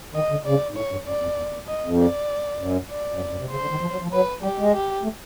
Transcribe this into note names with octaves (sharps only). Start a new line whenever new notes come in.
D#3 D#5
D3
C#3 D5
G#2
A2 C#5
G2
F#2 D5
F2
E2
E2
F2 D#5
F2
D5
F#2
D5
F#2
F2
F#2
C3
C#3 C5
D3
D#3
F3
F#3
F3
F#3 B4
G3 G4
G#3
G4
A3